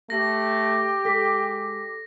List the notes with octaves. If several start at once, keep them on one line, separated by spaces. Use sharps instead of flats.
A3 G4 A#6
G#3 A4 D6 B6